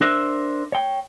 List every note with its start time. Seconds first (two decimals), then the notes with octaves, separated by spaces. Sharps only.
0.01 D4 A#4 C5 E5
0.72 C#5 G5